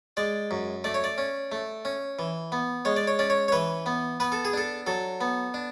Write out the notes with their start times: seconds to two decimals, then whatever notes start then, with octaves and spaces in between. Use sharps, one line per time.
0.17 G#3 D5
0.51 F#2
0.84 A3 D5
0.94 C#5
1.04 D5
1.18 C#4
1.52 A3
1.85 C#4
2.19 E3
2.52 B3
2.85 G#3 C#5
2.96 D5
3.07 C#5
3.19 C#4 D5
3.30 C#5
3.48 C#5
3.52 E3 B4
3.86 B3
4.20 B3 B4
4.32 A4
4.45 G#4
4.53 D4 A4
4.87 F#3 A4
5.21 B3
5.54 D4